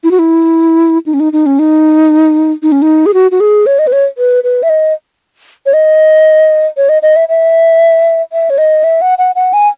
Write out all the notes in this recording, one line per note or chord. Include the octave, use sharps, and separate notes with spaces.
E4
F#4
E4
D#4
C#4
D#4
D#4
C#4
D#4
D#4
C#4
D#4
G#4
F#4
F#4
G#4
C#5
D#5
B4
C#5
B4
B4
E5
D#5
C#5
D#5
C#5
D#5
D#5
E5
E5
E5
C#5
D#5
E5
F#5
F#5
F#5
G#5